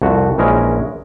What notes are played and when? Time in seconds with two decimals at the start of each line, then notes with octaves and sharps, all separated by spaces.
0.02 C2 F2 F#4
0.38 A#1 E3 G#3 C#4 A#4